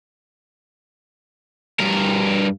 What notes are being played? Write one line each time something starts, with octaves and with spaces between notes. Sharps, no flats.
G2 A#4